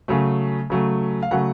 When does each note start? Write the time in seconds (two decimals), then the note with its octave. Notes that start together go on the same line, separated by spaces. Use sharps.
0.08 C#3 F#3 A3
0.70 C#3 F#3 A3
1.22 F5
1.31 C#3 F#3 A3 F#5